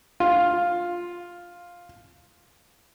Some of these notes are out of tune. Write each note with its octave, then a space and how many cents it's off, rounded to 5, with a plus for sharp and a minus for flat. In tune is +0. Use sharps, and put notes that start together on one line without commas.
F4 +5